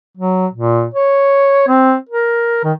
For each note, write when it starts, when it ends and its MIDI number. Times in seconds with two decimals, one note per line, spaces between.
0.17 0.47 54
0.53 0.87 46
0.94 1.65 73
1.67 1.95 60
2.09 2.60 70
2.64 2.72 51